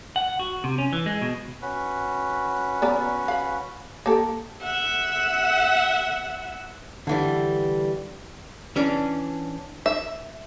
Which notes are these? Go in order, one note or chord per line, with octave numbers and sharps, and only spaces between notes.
F#5
F#4
C3
C#4
E3
G#3
B2
C#4 F#4 B4
B3 D5 A#5
F5 B5
A#3 G4 A4
E5 F#5
D3 E3 G3
E3 C#4 D4
E5